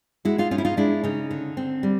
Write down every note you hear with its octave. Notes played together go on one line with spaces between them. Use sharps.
G#3 E4 F#4
D#4 F4
C#4 D#4 F4
E4
D#4 F4
G#3 D4 E4
C#3 D#4
D3
C4
G3